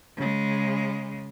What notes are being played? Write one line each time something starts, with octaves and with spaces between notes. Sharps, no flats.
C#3 G#3